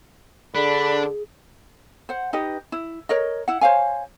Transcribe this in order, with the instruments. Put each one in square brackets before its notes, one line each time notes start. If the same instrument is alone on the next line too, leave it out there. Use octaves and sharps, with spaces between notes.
[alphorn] D3 [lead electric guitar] D4 [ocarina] G#4 [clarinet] B5
[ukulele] C5 F#5
D#4 G4 B4 D#5
E4
A#4 C#5 D#5
E4 F#5
C5 C#5 F5 G#5